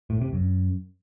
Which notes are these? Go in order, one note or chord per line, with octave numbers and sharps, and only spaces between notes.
A2
C3
F#2